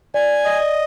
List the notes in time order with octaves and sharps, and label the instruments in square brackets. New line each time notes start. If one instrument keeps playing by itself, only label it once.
[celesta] D5 [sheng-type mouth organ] G#5
[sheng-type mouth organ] D#5
[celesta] D5